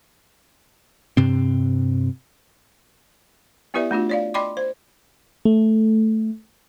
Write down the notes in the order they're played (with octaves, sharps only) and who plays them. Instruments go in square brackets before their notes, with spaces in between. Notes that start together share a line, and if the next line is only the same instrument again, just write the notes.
[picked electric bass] G2 C3 C4
[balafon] B3 E4 G4 B4 D5 E5
A3 D4 F4 F#4
C#5 D5 F5
D5 D#5 G5 B5 C6 D6
C5
[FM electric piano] A3